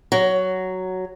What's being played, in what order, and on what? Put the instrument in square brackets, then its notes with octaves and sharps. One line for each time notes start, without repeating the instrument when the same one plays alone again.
[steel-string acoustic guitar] F#3